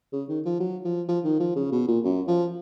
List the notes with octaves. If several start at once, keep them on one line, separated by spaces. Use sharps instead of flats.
C#3
D#3
F3
F#3
F3
F3
D#3
F3
C#3
B2
A#2
F#2
F3